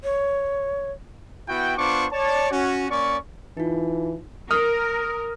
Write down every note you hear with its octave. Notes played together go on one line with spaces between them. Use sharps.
C#5
B3 E4 F#4 G5
B3 D4 F4 C5 C#6 D6
C#5 D5 A5
C#4 F#4
A#3 C#4 D5 C#6
E3 D#4 F4
A#4 D#6 F6